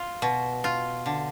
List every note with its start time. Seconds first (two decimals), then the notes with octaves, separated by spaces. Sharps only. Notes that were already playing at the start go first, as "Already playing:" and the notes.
Already playing: F4
0.22 B2
0.64 F4
1.06 D3